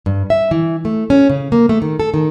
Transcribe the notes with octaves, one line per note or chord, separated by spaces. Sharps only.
G2
E5
E3
A3
C#4
C#3
A#3
A3
D#3
A4
D#3